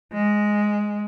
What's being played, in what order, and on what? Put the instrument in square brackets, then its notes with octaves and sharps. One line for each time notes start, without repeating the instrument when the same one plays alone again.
[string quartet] G#3